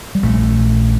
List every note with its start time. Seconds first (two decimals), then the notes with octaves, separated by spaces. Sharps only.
0.15 G3
0.23 A#1 A#2 A3